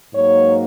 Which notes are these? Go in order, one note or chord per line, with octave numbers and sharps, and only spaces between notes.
G#2 F#3 A#3 C#5